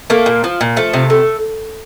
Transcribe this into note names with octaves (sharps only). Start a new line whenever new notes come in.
A3 A#3
A#2
F3
A#2
F3 A3
C3
A3